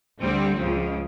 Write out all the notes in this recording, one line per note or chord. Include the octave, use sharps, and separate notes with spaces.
D2 D3 G3 C4
C#2 C#3 F3